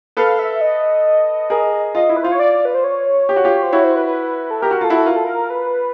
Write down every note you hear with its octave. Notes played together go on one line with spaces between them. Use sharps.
A4 B4 F5
E5
D#5
G#4 A#4
F4 D#5
E4
B4
F4 C5
C#5
D5
B4
C5
C#5
G4
F#4
F4 G4
C5
E4 F#4 C#5
C5
B4
B4
A4
G4 A#4
F#4
F4 A4
E4 F#4
F4 A#4
A4
A#4
B4